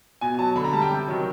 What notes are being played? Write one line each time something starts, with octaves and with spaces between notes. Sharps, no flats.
B2 G#5
F#3 A5
D3 B5
A#5
G3 A5
G5
C3
D#3 F#3